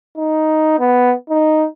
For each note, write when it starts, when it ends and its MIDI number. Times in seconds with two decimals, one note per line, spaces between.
0.17 0.78 63
0.80 1.13 59
1.30 1.66 63